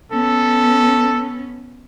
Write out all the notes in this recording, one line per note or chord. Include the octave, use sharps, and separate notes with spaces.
B3 C#4 A4